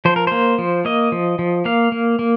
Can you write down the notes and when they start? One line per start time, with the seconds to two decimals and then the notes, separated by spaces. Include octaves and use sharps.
0.05 F3 C5
0.16 A#4
0.27 A#3 C5
0.58 F3
0.85 A#3 D#5
1.12 F3
1.39 F3
1.65 A#3 F5
1.92 A#3
2.19 A#3